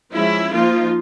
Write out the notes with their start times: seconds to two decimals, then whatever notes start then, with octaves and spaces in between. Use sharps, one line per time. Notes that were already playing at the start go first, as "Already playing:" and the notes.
0.13 F3 G#3 C#4 E4
0.52 F3 A#3 D#4 F4